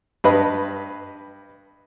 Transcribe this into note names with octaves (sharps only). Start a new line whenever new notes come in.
G2 B4 D#5 B5